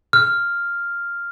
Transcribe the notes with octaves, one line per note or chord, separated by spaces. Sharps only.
F6